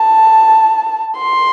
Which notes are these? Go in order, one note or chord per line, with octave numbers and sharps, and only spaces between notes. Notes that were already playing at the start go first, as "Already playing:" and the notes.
Already playing: A5
C6